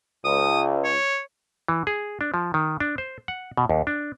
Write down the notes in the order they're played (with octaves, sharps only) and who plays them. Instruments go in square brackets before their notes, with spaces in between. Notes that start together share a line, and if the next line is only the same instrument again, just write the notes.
[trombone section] C#2 [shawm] D#6
[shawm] C#5
[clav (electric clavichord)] E3
G#4
D4
F3
D#3
D4
C5
F#5
B2
D#2
D4